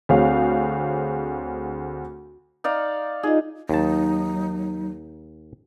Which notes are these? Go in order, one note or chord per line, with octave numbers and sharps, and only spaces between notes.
D2 C4 G#4 C#5 F5
D#4 D5 F5
D#4 F4 G#4 D#5
D#2 F#3 D#4 A5